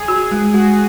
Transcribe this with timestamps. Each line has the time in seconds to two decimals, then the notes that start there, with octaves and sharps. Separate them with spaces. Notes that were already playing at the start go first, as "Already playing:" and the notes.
Already playing: G#4
0.08 F#4
0.31 G#3
0.53 G#3 F#4